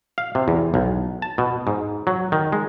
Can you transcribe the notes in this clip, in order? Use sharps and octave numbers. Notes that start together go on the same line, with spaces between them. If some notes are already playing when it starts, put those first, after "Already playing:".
F5
C3
E2
B1
A5
B2
G#2
F#3
D#3
G#3